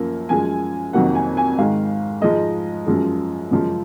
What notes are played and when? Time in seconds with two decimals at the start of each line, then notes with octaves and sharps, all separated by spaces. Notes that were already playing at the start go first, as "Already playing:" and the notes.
Already playing: F#2 F3 A#3
0.29 F#2 F3 G#3 G#5
0.93 F2 C3 D#3 F#3 A#3 F#5
1.15 G#5
1.37 G#5
1.58 G#2 D#3 G#3 F5
2.22 G#2 F3 G#3 D#5
2.86 F#2 F3 G#3
3.51 F#2 C#3 F3 G#3